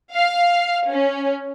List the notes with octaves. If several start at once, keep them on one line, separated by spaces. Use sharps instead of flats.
F5
C#4